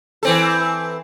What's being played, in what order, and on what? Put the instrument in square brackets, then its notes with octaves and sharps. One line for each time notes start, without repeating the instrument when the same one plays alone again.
[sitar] E3 C4 A4